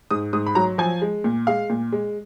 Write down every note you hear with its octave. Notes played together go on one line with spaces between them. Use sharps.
G#2 D#6
G#2 D#6
B5
F#3 A#5
F3 G#5
G#3
A#2
G#3 F5
A#2
G#3